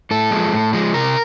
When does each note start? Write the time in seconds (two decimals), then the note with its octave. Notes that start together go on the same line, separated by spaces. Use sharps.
0.11 A2 A4
0.31 F3 G#3
0.52 A2
0.73 F3 G#3
0.94 C3 A#4